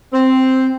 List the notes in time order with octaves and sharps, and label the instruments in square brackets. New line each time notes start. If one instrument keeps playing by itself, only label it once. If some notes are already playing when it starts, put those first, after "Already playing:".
[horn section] C4